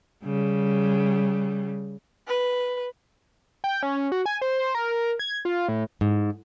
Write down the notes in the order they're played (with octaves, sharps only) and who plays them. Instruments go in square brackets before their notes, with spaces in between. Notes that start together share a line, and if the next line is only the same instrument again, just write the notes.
[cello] C#3 G3
[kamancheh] B4
[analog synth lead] G5
C#4
F#4
G#5
C5
A#4
G#6
F4
A2
[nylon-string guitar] G#2